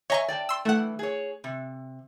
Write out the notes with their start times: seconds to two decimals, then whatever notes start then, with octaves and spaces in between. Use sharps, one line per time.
0.10 C#5 D#5 E5 G#5 A#5 C#6
0.28 D5 G5 A5
0.49 C6 E6
0.65 G2 E3 A3 F#5
0.99 G#4 C#5
1.44 C3